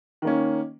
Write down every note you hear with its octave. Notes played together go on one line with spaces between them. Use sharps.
D#3 A#3 C#4